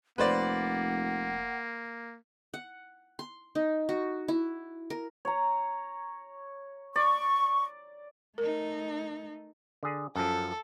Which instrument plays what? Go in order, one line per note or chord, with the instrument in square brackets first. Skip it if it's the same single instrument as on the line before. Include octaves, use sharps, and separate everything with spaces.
[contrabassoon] F1 [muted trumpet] A#3 [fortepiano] B4 C5 D5 [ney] F#5
[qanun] F#5
C6
D#4
F#4
E4
A#4
[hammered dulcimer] C#5 A#5
[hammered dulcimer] D5 [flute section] C#6
[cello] A3 D#4 [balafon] A#4
[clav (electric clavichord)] D3 G#4
[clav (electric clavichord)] F#2 F3 [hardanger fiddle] A4